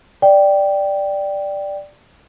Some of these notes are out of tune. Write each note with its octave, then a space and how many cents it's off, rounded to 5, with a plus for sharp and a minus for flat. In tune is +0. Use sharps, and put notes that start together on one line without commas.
D5 +0 G5 +0